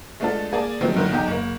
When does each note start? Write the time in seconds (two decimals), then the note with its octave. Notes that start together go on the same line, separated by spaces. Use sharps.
0.20 G#3 A3 B3 D4 F4 A4
0.52 A#3 G#4 D5 A5
0.81 D#3 F3 F#3 G#3 A3 C4
0.95 F#2 D3 D#3
1.11 B1 E2 D#4 G5
1.27 F#1 A#3